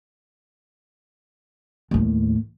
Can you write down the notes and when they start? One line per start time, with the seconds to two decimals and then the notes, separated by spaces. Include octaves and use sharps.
1.91 D#2 A2